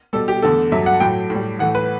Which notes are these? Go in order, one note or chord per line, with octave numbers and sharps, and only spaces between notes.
B2 G3 A4
G4
E2 D3 A3 A4
G2 F#3 A3 E5
F#5
A2 F#3 A3 G5
A2
G3
A2 E3 A3 F#5
B4